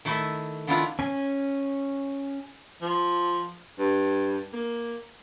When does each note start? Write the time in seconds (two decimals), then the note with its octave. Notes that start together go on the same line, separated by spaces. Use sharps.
0.05 D#3 A3 E4 D#5 E5
0.67 D#3 B3 D4 E4 F4
0.99 C#4 G#5
2.82 F3
3.79 G2
4.53 A#3